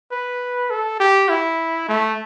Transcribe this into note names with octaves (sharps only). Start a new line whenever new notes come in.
B4
A4
G4
E4
A3